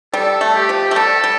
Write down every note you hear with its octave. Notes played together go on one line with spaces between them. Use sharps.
G3 A4
A3
G4
F3
A3
G3 A4
G3